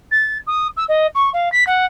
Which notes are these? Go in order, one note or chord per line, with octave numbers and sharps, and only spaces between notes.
A6
D#6
E6
D#5
C#6
F5
B6
F#5